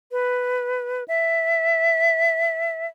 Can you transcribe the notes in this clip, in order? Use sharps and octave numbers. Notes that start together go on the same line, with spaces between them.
B4
E5